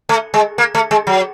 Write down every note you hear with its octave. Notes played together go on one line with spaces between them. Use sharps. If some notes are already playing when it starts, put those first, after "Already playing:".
A3
G#3
A#3
A3
G#3
F#3